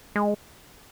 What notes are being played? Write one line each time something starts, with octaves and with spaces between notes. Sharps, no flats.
G#3